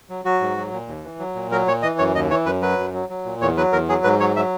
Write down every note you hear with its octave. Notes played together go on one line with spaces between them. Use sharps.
F#3
F#3 F#4
G#2
F#3
A#2
D#2
E3
F#3
A#2
F#3 A#4
A#2 C#5
E3 D#5
F#2 C#5
D#2 D#5
E3 C#5
F#2 B4
F#3 B4
F#2
F#3
F#3
A#2
E2 C#5
F#3 B4
E2 A#4
F#3 G#4
G#2 B4
F#3 C#5
F#3 E5